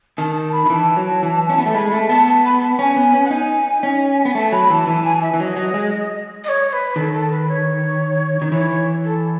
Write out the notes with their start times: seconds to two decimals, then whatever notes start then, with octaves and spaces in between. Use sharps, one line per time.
0.18 D#3 A5
0.35 A5
0.52 B5
0.66 D#3
0.70 E3 A5
0.97 F#3
1.23 E3
1.50 C#4
1.58 B3
1.66 A3
1.74 G#3 B5
1.91 A3 A5
2.09 B3 A5
2.27 A5
2.45 B5
2.61 A5
2.78 C#4 G#5
2.96 B3
3.13 C#4
3.25 F#5
3.30 D#4 G#5
3.83 C#4
4.25 B3
4.35 A3 A5
4.52 F#3 B5
4.70 E3 A5
4.87 E3 A5
5.04 G#5
5.22 E5
5.34 E3
5.40 F#3 D#5 E5
5.57 F#3
5.74 G#3
6.44 D#5
6.49 C#5
6.69 C#5
6.73 B4
6.96 D#3 A4
7.13 A4
7.31 B4
7.48 C#5
8.42 D#3
8.52 E3 C#5
8.70 C#5
9.05 A4